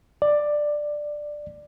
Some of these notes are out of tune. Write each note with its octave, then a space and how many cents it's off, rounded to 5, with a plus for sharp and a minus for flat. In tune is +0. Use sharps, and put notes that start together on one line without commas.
D5 +10